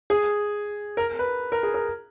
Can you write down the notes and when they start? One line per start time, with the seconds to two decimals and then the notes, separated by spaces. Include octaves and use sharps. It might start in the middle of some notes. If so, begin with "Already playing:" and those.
0.10 G#4
0.97 A#4
1.19 B4
1.52 A#4
1.63 G#4
1.74 A#4